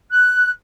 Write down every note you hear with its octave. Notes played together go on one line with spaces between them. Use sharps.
F#6